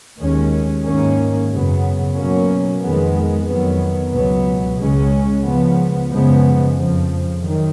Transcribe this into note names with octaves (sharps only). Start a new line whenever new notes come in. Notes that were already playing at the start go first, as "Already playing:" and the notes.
D#2 D#3 G#3 C#4
G#2 D#3 A#3 C#4
F#2 C#3 F#3 B3
B2 F#3 A#3 C#4
F2 D#3 G#3 B3
F2 D#3 F#3 B3
C#2 B2 F#3 B3
C#2 C#3 G#3 C#4
C#2 C#3 F3 B3
F#2 C#3 F3 G#3 B3
F2 C#3 F3
F#2 D#3